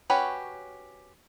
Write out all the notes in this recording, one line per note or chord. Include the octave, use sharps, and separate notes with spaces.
C#4 F#4 G4 B4 C#5